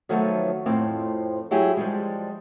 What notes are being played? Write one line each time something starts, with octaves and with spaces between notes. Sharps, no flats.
D#3 F3 F#3 A3 B3
F2 A2 F3 C4
F#3 E4 G4 G#4
F3 G3 G#3